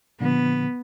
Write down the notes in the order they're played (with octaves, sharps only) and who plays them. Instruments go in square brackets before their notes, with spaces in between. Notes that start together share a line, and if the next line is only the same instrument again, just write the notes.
[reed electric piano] A#2 D3 F3 [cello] B3